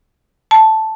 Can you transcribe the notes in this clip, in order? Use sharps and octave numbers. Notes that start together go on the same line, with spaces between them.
A5